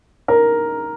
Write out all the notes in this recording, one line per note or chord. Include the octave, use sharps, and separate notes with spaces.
A#4